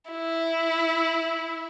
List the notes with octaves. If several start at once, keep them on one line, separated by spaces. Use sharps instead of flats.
E4